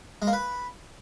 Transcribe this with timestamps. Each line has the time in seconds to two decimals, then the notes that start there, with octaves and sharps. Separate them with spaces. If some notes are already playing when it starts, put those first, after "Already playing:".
0.22 G#3
0.27 A#3
0.33 B4